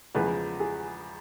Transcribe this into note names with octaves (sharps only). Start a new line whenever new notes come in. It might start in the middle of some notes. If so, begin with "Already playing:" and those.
E2 C#3 F3 G#3 B4
G#4